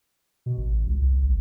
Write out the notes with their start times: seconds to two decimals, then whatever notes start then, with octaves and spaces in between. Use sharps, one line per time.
0.46 B2
0.58 A1
0.87 C#2
1.01 C2
1.22 A1